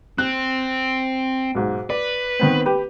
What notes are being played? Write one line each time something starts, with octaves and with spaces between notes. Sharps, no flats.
C4 F#6
B1 G#2
B4 D5
D#3 B3 C4
G4 B4